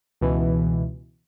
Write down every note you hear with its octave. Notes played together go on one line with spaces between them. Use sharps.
C#2 B2 E3